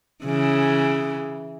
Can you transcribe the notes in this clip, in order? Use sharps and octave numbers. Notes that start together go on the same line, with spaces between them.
C#3 E3